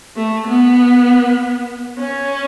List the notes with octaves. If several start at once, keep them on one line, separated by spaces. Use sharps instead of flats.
A3
B3
C#4